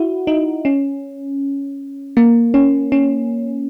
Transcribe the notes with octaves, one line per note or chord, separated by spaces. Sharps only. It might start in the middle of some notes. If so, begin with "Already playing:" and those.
Already playing: E4 F#4
D#4
C#4
A#3
C#4
C#4